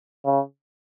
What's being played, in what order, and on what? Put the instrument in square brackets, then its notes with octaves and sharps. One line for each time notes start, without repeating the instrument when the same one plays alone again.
[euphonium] C#3